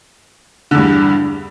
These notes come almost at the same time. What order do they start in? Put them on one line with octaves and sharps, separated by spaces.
D3 E2 G2